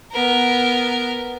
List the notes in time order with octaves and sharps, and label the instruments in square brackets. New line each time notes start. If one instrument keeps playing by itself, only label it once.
[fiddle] B3 A#4